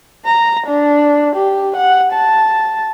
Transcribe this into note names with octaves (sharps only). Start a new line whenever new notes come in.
A#5
D4
G4
F#5
A5